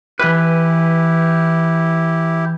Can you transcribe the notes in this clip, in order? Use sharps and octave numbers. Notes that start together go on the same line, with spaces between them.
E3 E4 G4 B4